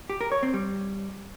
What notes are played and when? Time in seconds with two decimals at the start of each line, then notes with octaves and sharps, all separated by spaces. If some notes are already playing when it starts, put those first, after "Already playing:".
0.10 G4
0.21 A#4
0.32 C#5
0.43 C4
0.54 G3